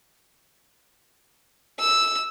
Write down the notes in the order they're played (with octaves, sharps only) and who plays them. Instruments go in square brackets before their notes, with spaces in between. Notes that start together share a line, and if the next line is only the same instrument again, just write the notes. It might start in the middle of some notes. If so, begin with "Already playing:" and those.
[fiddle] E6